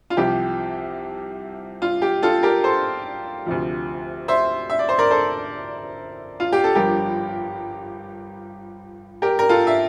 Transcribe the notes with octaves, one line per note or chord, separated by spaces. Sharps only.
F4
C2 C3 F3 G4
F4
G4
F4 A4
G4 A#4
A4 C5
D2 C3 F3
C5 E5
E5
D5
C5
A#4 D5
A4 C5
F4
G4
A4
G1 G2 F3 G4 A#4
G4 A#4
A#4
F4 A4
E5